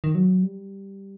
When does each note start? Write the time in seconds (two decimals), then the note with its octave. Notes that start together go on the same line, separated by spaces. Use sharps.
0.04 D#3
0.15 F#3
0.43 G3